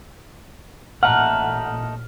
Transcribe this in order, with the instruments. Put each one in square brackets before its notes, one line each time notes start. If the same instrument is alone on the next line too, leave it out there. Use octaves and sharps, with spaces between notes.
[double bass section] A1 A#2 [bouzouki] A3 D#4 [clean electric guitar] F#5 [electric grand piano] F6